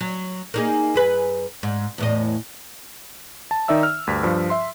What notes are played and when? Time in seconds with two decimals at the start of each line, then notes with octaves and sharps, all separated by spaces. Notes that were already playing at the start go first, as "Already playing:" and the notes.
0.01 F#3
0.54 A#3 D#4 G#4
0.94 F#2 G#4 B4
1.63 G#2
1.98 E2 A2 D#5
3.51 A5
3.68 D#3 D#4 D5 E5 E6
3.83 F6
4.07 D2 G2 B6
4.23 G2 F3
4.50 E5 C6